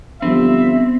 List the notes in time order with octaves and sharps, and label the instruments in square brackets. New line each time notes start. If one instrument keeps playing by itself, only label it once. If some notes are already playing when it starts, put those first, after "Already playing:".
[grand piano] D3 F3 G3 [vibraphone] B3 [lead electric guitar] C4 [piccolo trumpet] E5